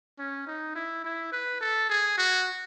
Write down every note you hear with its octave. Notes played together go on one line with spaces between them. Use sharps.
C#4
D#4
E4
E4
B4
A4
G#4
F#4